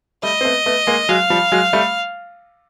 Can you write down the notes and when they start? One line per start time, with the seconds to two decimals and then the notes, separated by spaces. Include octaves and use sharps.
0.23 G3 A3 D#5
0.41 C4
0.45 A3 B3
0.66 A3 B3
0.87 G#3 A#3
1.09 F#3 G#3 F5
1.30 F3 G3
1.52 F#3 G#3
1.73 G3 A3